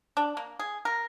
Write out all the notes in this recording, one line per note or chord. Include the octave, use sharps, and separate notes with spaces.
D4
A#3
G#4
A#4